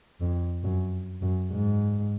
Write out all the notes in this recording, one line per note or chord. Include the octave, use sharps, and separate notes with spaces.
F2
F#2
F#2
G#2